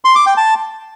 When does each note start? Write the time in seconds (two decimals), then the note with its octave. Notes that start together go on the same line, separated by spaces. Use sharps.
0.05 C6
0.15 D6
0.26 G5
0.37 A5